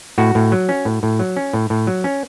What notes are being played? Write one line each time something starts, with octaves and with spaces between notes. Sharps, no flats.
A2 F#4
A2
F#3
C#4
A2
A2
F#3
C#4
A2
A2
F#3
C#4